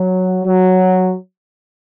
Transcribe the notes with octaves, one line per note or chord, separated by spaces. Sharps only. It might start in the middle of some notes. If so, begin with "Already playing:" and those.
Already playing: F#3
F#3